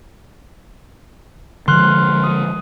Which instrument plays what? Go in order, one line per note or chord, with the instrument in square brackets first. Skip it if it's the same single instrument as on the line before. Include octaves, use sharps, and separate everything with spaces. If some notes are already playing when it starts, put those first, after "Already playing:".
[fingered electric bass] D3 F3 G#3 [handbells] C6 F6 F#6
[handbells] D#6